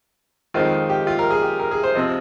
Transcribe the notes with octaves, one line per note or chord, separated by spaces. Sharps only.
F2 D#3 G#3 C4 F4
G4
F4
A#4
G#4
G4
A#4
G#4
C5
C3 F3 D#5